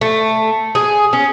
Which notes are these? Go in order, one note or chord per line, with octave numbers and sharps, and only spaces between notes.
A3
G#4
C#4